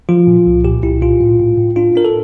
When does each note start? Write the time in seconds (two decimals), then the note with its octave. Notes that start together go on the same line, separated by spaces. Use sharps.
0.09 F3 F4
0.27 A#2
0.46 C2
0.65 A#2 G4
0.83 C2 E4
1.01 A#2 F4
1.21 A2
1.39 A2
1.58 A2
1.76 D4 F4
1.95 D4 A#4
2.05 A4